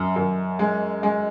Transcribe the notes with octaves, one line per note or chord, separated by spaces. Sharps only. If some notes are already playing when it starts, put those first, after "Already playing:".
Already playing: F#2
F#2
G#3
G#3